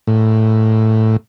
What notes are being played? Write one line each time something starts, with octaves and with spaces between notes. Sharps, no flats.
A2